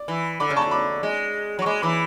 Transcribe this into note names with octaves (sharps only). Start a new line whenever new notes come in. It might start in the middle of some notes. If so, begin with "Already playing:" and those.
Already playing: D5
E3
D3 B5 D6
C#3
A5 C#6
D3
B5 D6
G#3
F#3
C#6
G#3 B5 D6
E3 B5 D6